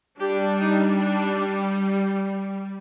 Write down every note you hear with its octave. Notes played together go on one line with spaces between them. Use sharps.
G3 D4 G4
D#4
D4